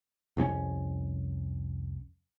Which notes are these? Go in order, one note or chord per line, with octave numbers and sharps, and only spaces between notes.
C2 F2 C4 C#4